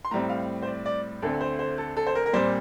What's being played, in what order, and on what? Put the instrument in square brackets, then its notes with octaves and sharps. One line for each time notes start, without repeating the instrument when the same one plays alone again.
[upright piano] C6
A2 G3 C4 A#5
F5
C5
D5
D5
D2 D3 A3 C4 A4
C5
C5
A4
A4
C5
A#4
A#4
A#2 G3 C4 C5